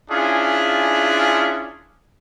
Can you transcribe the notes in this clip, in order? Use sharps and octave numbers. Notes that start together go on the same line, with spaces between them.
C#4 D4 E4 F4 G#4